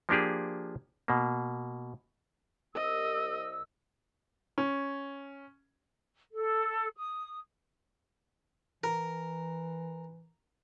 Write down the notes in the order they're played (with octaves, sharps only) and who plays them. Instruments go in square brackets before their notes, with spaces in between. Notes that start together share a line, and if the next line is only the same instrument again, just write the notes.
[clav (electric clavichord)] F3 A#3 D4 G4 G#4
B2 A#3
[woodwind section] C2 E6 [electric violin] D#5
[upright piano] C#4
[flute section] A4
D#6
[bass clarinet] E3 [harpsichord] A#4